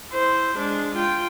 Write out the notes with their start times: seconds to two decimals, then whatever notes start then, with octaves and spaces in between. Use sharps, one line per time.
0.11 E4 C5
0.57 G#3 D4
0.95 F4 G5